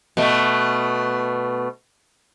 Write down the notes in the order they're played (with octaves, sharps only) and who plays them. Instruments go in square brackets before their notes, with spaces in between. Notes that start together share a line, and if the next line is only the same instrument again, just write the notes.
[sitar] B2 A3